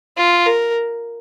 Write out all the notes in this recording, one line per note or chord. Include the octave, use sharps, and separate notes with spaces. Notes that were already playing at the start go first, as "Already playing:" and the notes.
F4
A#4